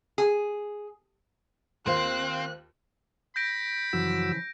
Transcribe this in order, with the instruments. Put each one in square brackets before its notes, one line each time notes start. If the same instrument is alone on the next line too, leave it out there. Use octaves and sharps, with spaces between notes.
[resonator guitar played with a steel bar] G#4
[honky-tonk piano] D#2 F4 [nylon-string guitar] A#3 C5 [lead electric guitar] C4 [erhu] F#6
[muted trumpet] B5 [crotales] G6 A#6 D7
[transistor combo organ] F#2 F#4 E6 [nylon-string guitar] C#3 E3 F3